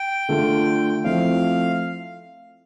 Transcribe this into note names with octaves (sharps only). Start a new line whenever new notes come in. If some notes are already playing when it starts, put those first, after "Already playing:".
Already playing: G5
D3 A3 D4 F4
F3 A3 C4 E4 F5